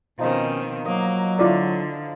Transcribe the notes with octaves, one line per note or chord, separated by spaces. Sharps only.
B2 D#3 F3 C4 C#4 D#4
F#3 A#3 D#5
D3 E4 F4 D5 F5 C6